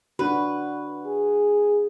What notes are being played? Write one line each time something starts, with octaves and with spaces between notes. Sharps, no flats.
D4 F#4 B4
G#4